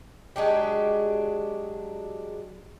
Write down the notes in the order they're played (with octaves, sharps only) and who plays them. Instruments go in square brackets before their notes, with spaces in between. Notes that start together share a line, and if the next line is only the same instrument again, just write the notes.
[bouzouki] F#3 G#3 D4 G4